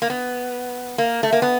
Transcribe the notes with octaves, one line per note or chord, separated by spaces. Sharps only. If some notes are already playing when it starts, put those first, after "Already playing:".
A#3
B3
A#3
A3
A#3
B3